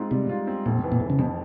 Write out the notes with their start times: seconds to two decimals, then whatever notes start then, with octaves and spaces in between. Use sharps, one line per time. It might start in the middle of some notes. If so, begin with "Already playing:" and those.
Already playing: G#2 C4 F4
0.11 C3 G3
0.29 F4
0.47 C4
0.66 F1 A#2
0.84 E3
0.92 A#2
1.02 F1
1.10 C#3
1.19 F2 C3